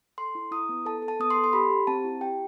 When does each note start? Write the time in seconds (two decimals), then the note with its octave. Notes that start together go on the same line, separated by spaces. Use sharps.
0.18 A4 C6
0.35 E4
0.51 E4 D#6
0.69 B3
0.86 A4 A5
1.02 A4
1.08 A5
1.20 B3 D#6
1.30 C6
1.36 A4
1.44 C6
1.53 G4 B5
1.70 G4
1.87 C4 A5
2.05 E4
2.21 G4 G5